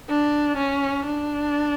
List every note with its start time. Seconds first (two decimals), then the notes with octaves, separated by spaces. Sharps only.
0.09 D4
0.57 C#4
1.06 D4